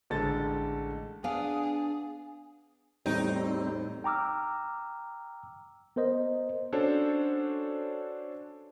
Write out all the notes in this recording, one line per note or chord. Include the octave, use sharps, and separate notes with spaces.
A1 D3 G#3 A4 A6
B3 D4 G#4 F5
E2 A2 G3 C4 D#4 D7
G5 A#5 D6 E6 F6
B3 A#4 C5 D#5
C#4 D4 F#4 A4 C5 C#5